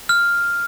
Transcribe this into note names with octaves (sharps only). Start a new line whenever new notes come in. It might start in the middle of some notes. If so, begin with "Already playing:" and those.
F6